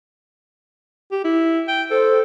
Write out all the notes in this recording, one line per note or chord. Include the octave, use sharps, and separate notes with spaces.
G4
E4
G5
A4 C5